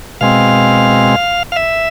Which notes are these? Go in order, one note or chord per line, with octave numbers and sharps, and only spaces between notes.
B2 G#3 C4 F5
F5
E5